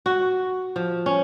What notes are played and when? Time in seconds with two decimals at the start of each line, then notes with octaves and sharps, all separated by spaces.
0.06 F#4
0.76 F3
1.06 C#4